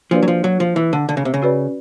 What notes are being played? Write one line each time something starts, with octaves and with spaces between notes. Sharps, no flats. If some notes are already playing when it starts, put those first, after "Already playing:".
F3 A#3 D4 F#4 B4 D5
F#3
F3
F#3
F3
E3
D3
D3
C#3
C3
C#3
C#4 F#4 B4 D5